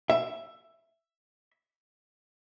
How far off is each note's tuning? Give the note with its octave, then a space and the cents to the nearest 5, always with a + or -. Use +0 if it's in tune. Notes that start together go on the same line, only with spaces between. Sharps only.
E5 +10